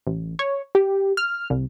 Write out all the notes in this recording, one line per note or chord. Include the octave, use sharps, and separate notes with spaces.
A1
C#5
G4
F6
C2